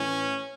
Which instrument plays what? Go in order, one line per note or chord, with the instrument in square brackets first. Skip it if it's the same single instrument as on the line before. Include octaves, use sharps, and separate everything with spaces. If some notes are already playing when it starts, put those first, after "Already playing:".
Already playing: [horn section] A2 E3 C#4